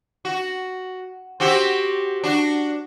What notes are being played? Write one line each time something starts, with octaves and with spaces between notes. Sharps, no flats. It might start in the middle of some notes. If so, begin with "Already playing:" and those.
F#4
C4 F#4 G4
D4 F#4